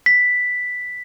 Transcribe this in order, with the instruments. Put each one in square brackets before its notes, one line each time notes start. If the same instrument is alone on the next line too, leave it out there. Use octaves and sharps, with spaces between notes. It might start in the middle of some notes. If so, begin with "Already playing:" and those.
[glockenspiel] B6